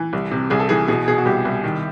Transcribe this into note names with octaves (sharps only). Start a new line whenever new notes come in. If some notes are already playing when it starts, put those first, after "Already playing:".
Already playing: E3
C2
C3
C2 G#4
A4
E3 G#4
B2 G#4
B2 G#4
F#4
C2 G4
C2
D#3